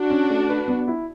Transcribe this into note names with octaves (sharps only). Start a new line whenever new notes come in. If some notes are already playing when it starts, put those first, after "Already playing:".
Already playing: D4 F#4
C#4
A3
B4
B3
E4